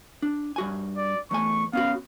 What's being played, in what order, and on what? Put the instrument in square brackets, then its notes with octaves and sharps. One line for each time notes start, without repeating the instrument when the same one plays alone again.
[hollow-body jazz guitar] D4
G2 F#4 G#5
[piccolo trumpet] D5
[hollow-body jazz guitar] E2 A3 G#5 [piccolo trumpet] C#6
[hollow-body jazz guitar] B3 C#4 F#4 [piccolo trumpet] F5